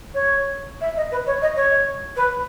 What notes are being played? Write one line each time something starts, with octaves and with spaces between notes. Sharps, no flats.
C#5
E5
D#5
B4
C#5
D#5
C#5
B4